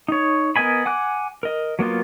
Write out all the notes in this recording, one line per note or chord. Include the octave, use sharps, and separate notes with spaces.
D#4 C#5
B3 A#4 D#5 G#5 B5
F#5 G#5 D6 F#6
A#4 D#5
F#3 A#3 B3 F4